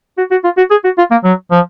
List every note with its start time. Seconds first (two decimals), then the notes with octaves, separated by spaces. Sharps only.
0.18 F#4
0.31 F#4
0.44 F4
0.57 F#4
0.71 G#4
0.84 F#4
0.98 F4
1.11 A#3
1.24 F#3
1.51 F3